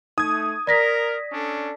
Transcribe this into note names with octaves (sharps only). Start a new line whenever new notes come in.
A3 D#4 D#6 G#6
A#4 D5 A#6 B6
C#4 D4 A4